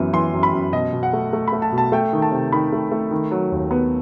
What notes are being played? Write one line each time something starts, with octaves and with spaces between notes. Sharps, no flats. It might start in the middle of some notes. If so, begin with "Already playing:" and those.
Already playing: F#2 E3 B3
E3 C6
F#2
B5
F#2
B2 D#5
B2
F#5
A3
A3
B5
A3
A5
B2
A5
A3 G5
D#3
A5
C3
D#3 B5
A3
A3
D#3
F#3
D#2
B3